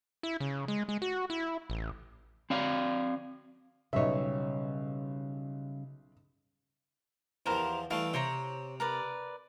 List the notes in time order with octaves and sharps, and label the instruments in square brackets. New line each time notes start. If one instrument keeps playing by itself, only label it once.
[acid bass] E4
C#3
G#3
G#3
F#4
E4
A1
[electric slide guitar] C4 D5 F5
[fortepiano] B1 E5 [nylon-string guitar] C#3 G3 C#5
[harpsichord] E2 F3 [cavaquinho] G4 A#4 C5
[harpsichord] E3 G3 A3 [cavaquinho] F5
[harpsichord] C3 [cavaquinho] C5 C#5 A#5
[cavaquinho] A#4 B4 D5